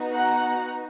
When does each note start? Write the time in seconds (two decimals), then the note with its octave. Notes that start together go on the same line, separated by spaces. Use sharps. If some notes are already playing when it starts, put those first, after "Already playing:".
Already playing: B3 D#4 F#4
0.14 F#5 A#5